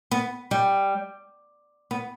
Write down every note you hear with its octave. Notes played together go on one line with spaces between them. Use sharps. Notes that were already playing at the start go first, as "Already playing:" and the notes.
B3
G3
B3